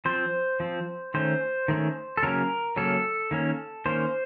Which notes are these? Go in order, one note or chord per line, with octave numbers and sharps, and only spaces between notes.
F3 C4 C5
F3 C4
D#3 A3 C#4 C5
D#3 A3 C#4
A4
C#3 F#3 A#3 C#4 A#4
C#3 F#3 A#3 C#4 A4
D#3 A#3 C#4
D#3 A#3 C#4 C5